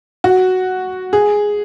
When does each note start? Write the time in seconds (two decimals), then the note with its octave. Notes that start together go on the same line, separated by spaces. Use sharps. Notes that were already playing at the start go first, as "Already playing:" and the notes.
0.24 F#4
1.13 G#4